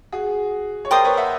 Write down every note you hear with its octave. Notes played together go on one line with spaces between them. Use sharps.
F#4 G#4
C#5
A#4 C5 D5 G5 C6 D#6
B4 C#5
E5 F#5